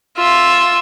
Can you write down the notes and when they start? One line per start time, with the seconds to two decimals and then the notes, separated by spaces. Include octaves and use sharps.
0.17 F4 E5